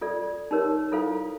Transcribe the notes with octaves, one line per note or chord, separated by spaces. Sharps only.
F4 A4 D5
D#4 G4 A#4 C#5
E4 F4 A4 C5 F5